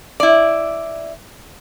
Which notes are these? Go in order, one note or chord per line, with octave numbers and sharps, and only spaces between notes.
E4 D5